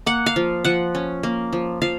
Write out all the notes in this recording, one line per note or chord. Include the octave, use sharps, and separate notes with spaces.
A#3 F#5
F5
F3
F3 F#5
C#4
A#3
F3
F3 F5